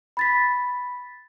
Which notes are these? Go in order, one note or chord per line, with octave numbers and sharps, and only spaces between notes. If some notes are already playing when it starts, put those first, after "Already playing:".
B5 A6 B6